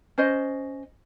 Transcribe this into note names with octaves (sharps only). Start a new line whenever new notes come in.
C#4 C5 D#5